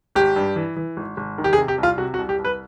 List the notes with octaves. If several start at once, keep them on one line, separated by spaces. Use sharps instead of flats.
G#1 G4
G2
E3
E3
G#1
G#1
D#3
G4
G#4
C3
G4
C2 F4
C3 F#4
F#4
C2
G4
C2
B4